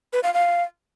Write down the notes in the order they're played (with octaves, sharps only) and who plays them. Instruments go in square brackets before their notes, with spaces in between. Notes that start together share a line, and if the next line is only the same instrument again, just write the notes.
[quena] B4
F5
F5